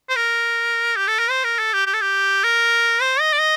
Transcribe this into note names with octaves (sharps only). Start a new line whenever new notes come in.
C5
A#4
G4
A4
A#4
C5
A#4
A4
G4
G4
A4
G4
A#4
C5
D#5
D5
D#5